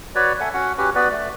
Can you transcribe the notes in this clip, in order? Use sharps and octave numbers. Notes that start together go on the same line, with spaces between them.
F#4 B4 C#5 D5
A4 E5 F#5 G#5
C#4 F#4 F#5
C#4 F#4 G4 B4
B3 F#4 B4 D5
A3 D5